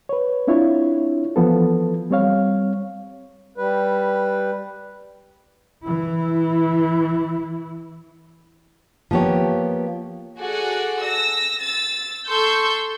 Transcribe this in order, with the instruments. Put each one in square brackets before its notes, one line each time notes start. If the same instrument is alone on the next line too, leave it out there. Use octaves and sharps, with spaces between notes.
[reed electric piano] B4 C#5
C4 D4 E4 F4 C#5
E3 F3 B3 A4
G3 C4 C#5 F5
[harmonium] G3 B4
[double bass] E3 E4
[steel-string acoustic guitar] F3 A#3 B3 G4 C#5
[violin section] F#4 G#4 A4 D5 F#5
E6 A#6
E6 A6
A4 C6 C#6 E6 G6